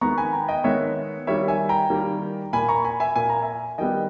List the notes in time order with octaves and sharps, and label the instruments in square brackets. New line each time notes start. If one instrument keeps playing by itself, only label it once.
[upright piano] D#3 G#3 B3 A#5 C#6
G#5 B5
G5 A#5
D#5 G5
D#3 G#3 B3 C#5 E5
D#3 G3 A#3 C#5 E5
E5 G#5
G5 A#5
D#3 G3 A#3
A#2 A#3 G#5 B5
A#5 C#6
G#5 B5
E5 G#5
A#2 A#3 G#5
A#5
E5 G#5
D#3 G3 B3 D#5 G5